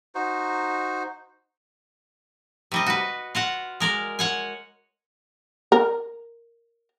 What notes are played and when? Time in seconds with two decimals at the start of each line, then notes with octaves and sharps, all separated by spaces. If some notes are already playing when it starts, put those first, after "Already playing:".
0.15 D#4 F#4 C5
2.72 C3 G3 D#5
2.86 F#4 B4
3.35 F4 F#4 F#5
3.80 G#3 A#4 D5
4.19 C#5 F#5 G#5
5.72 A#4